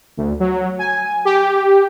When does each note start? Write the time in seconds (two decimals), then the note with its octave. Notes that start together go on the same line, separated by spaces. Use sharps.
0.17 D2
0.40 F#3
0.79 G#5
1.25 G4